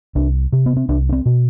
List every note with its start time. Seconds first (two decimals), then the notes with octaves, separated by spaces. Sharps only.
0.15 C2 D4
0.52 C3
0.66 B3
0.76 C4
0.89 C2 D4
1.09 D4
1.13 C4
1.26 B2